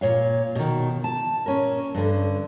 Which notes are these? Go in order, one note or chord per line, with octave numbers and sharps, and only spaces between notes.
A#2 C#5 F5
B2 D#3
A5
A#2 C#4 A#4
G2 D3